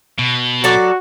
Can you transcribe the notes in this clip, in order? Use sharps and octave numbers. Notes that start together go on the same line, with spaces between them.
B2
F#3 F#4 A4 D5